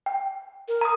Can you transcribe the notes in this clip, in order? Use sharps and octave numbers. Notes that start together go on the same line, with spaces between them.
G5
A#4
A#5 D#6